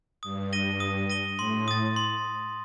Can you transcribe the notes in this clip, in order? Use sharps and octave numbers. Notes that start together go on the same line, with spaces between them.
G2 D#6
A#6 D#7 G7
D#6
A#6 D#7 G7
A2 C6
D#6 A6
C6